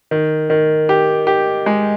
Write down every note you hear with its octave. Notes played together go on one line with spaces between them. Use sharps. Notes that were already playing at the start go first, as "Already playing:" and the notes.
D#3
D#3
G4
G4
G#3